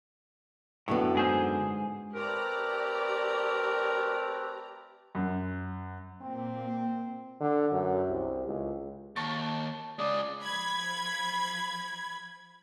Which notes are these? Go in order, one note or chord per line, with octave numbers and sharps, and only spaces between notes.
F#2 A2 D3 B3
G#2 G#4 C5
A3 C4 G4 A#4 B4 D5 A#5
F#2
A#2 C4
D3
F#2
C2
C#2
D#2 A5 C#6 A6
C#3 G#3 D5 D#6
F3 B5 G#6